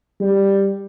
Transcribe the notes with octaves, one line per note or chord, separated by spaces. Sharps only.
G3